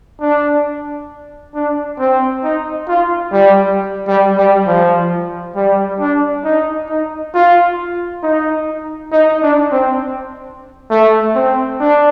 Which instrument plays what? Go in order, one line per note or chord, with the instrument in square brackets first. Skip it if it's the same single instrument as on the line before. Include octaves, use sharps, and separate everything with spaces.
[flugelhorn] D4
D4
C4
D#4
F4
G3
G3
G3
F3
G3
D4
D#4
D#4
F4
D#4
D#4
D4
C4
A3
C4
D4